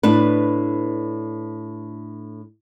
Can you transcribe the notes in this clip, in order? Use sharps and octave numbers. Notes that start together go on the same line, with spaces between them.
A2 D4 B4